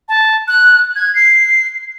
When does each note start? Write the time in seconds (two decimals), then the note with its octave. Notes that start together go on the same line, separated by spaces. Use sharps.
0.08 A5
0.48 F#6
0.96 G#6
1.15 C7